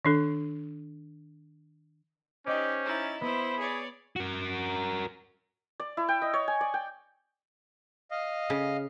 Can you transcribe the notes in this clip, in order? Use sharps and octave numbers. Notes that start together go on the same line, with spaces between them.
D#3 D4 A4
C#4 D#4 G4 C5 D5 D#5 D6
D#4 E4 A6
B3 E4 C5 B5 D#6
G#4 C#5 D5
F#4 A#4
D5
E4
G5
D#5
C#5
G#5
D5
G5
D#5 F5
C#3